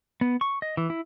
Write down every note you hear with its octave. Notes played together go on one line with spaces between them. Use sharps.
B3
C#6
D#5
E3
E4